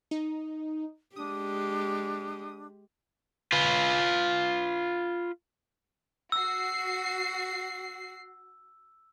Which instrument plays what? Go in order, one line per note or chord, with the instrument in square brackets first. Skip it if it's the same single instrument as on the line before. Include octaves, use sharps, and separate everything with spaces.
[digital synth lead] D#4
[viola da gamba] G#3 G4 [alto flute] D4 [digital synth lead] D#6
[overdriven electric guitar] F4 B4
[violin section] F#4 C7 [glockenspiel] E6